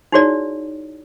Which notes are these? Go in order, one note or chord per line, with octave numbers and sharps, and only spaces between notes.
D#4 E4 F#4 G#4 C#5 D5